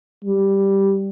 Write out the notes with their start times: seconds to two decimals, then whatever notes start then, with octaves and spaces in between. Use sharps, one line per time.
0.24 G3